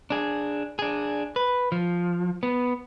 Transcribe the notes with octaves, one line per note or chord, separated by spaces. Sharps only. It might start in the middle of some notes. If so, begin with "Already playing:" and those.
D4 G#4
D4 G#4
B4
F3
B3